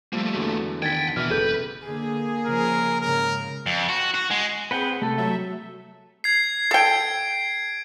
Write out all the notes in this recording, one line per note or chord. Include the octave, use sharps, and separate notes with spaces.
F3 G3 A3 A#3
E2 D3 F#4
D#3 F#5 G5 G#6 A6 B6
B2 E3 E5 F6
F#1 G#4 A4 B4 G6
D3 A#3 G#4
C#3 F3 A#4
G#2 C#3 A#4
F2
F#4
F#4
G#3
C4 G#4 B4 F#5 G5
C3 A3 A4
F#3 E5
G#6 C7
A4 G5 G#6 D7